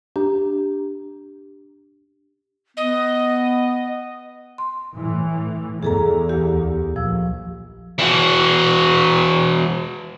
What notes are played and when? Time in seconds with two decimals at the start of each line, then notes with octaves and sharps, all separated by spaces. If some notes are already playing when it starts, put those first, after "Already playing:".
0.16 D4 G4 A#5
2.77 B3 D#5
4.58 C6
4.98 A2 E3
5.83 E2 G#4 A4 A#5
6.29 D2 G4
6.96 A#1 F3 E6
7.98 E3 F#4